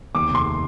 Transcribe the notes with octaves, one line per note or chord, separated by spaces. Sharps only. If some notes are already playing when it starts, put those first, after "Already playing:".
D#2 D6
F1 C6